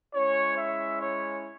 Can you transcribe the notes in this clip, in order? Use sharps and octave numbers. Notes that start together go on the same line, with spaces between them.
G#3 C#4 E4 C#5
E5
C#5